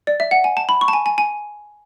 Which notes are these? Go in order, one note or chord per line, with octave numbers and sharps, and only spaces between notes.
D5
E5
F#5
G#5
A5
B5
C#6
A5
G#5
G#5
G#5